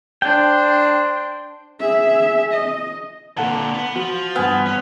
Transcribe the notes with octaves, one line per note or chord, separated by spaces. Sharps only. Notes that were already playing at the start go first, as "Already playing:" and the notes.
D4 C5 G5
G#4 E5
D#5
A#2 D3 A4 F#5 A5
B3
F3 F#4
G2 B3 G#5 F6
C#4